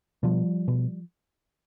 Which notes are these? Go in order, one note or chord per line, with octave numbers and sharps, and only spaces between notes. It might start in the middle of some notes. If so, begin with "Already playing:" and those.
B2 F3 G3
B2